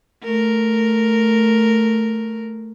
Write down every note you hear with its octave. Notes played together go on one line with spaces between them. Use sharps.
A3 A#4